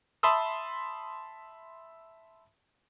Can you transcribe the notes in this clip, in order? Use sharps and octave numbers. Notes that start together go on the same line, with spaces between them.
E5 A5 B5 C6 D#6 E6